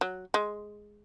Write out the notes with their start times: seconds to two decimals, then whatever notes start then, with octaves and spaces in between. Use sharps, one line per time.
0.01 F#3
0.34 G#3